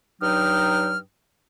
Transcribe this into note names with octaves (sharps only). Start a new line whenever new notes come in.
G2 F#3 D#4 G5 D#6 F6